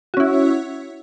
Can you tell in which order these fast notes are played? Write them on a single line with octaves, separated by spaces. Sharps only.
F#4 C#4 E4